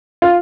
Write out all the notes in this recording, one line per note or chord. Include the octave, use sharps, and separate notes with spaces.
F4